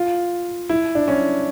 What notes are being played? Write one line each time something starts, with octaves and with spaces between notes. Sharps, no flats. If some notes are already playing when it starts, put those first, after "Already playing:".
Already playing: F4
E4
D4
C#4